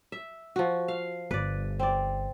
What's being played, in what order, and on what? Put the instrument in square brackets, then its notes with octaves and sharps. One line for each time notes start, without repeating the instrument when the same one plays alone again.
[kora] E5
F3 F#4
F5
[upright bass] G1 [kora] B4 D5
[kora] C4 D5